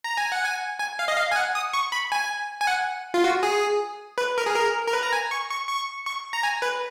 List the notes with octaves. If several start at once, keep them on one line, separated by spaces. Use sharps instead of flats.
A#5
G#5
F#5
G#5
G#5
F5
D#5
F5
G#5
F#5
D#6
C#6
B5
G#5
G#5
F#5
F4
F#4
G#4
B4
A#4
G#4
A#4
A#4
B4
A#5
G#5
C#6
C#6
C#6
C#6
A#5
G#5
B4